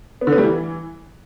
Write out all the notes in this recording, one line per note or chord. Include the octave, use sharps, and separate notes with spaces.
B3
D3
B3
G3
E3